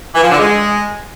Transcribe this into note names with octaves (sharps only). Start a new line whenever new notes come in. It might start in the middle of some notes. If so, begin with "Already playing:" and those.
E3
F3
D3
G#3